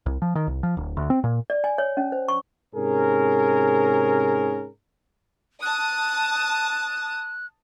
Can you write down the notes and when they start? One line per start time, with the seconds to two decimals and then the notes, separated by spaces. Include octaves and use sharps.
0.06 C2
0.22 F3
0.35 D#3
0.47 C2
0.63 F3
0.77 D1
0.97 D2
1.10 C4
1.24 A#2
1.50 D5
1.64 G#5
1.78 C#5
1.97 C#4
2.12 C5
2.28 C#6
2.75 G#2 C3 C#4 G#4 A#4
5.62 A5 D#6 F#6